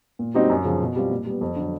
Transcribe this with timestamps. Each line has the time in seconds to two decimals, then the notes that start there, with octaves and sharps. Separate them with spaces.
0.19 A#2
0.34 G3 C4 D#4 F#4
0.50 F#2
0.65 C#3 F3
0.80 B2
0.95 G3 C4 F4
1.11 A#2
1.26 G3 B3
1.41 F2
1.56 D3 F#3